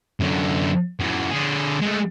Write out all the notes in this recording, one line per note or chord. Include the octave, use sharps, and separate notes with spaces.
F#2 D3
F#2 E3
D3 G#4
G#3 A3